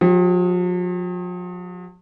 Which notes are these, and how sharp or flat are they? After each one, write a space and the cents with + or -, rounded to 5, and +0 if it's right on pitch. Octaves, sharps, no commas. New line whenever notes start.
F3 +45 G4 +0